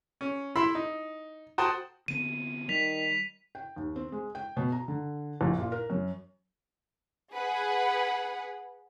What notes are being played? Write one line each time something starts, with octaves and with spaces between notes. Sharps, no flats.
C#4
E4 E5 B5 C6 E6
D#4
F#4 C5 G5 A5 D#6
D3 B3 C4 D#7
D#3 G3 B6 F7
G5
D#2
C4
G#3
G5
B2
A#5
D3
A#1
A#2
A#4
F#2
G#4 B4 F#5